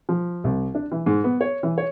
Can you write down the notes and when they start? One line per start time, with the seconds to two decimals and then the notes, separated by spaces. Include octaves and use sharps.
0.09 F3
0.44 C2
0.75 D4
0.92 E3
1.06 G#2
1.24 B3
1.41 C#5
1.63 E3
1.78 C#5